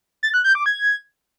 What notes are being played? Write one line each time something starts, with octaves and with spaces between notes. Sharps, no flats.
A6
F#6
G6
D6
G#6